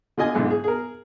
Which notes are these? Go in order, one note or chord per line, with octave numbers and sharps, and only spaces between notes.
D3 F4 D#5 G#5 D#6
B1 G#2 D3 E3 G#3 B3
G#4
G#4 A#4